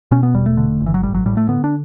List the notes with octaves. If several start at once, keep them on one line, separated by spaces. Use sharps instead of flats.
B2 C#4
B3
E1 G3
A3
D3
G1
E3
F#3
A1 G3
F#3
A2 G3
A3
D3 B3
D4